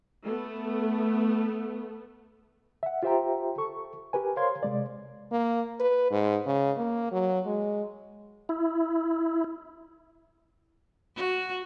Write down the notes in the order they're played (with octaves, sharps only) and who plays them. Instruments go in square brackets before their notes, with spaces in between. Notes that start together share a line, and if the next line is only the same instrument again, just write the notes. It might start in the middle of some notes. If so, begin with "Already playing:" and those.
[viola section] A3 B3
[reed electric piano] E5 F#5
F4 G4 C5 E5 G5 A#5
A4 C#6
G4 A#4 B4 G#5
A#4 C5 C#5 F5 C6 G#6
C3 G#3 D5
[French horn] A#3
B4
G#2
C#3
A#3
F#3
G#3
[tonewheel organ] E4
[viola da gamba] F#4